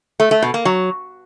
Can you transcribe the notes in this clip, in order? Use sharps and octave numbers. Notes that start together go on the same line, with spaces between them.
A3
A3
B2
A#3
F#3